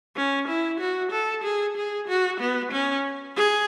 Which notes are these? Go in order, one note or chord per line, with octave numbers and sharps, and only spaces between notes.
C#4
E4
F#4
A4
G#4
G#4
F#4
B3
C#4
G#4